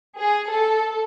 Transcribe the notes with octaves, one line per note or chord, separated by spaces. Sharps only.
G#4
A4